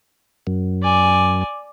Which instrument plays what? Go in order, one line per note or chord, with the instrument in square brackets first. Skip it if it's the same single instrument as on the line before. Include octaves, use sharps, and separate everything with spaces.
[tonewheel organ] F#2
[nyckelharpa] D5 G#5